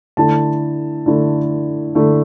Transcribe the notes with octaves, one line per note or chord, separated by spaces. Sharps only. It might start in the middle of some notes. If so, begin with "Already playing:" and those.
D3 A3 E4 A5
D3 A3 E4
D3 A3 E4